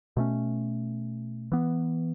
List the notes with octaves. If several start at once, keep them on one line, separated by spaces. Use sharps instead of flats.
B2 A3 C#4
E3 B3